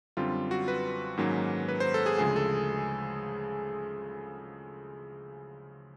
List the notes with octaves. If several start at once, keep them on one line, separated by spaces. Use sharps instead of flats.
F#2 D3 G3 C4 F4
F#4
B4
G#2 D#3 F#3 A#3 C#4
B4
C5
A4
G#4
D2 C#3 F3 G#3 G#4
A4